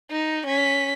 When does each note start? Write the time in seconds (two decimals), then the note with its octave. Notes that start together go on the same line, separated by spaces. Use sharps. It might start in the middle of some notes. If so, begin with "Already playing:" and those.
0.11 D#4
0.47 C#4 B6